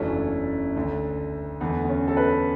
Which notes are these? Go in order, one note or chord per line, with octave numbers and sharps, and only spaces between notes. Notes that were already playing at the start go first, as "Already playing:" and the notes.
Already playing: F#1 E2 C#3 F#3 A3 C#4 D4 E4
D2 D3 A3
E2 D3 A3 B3
B3
C#4
A4
B4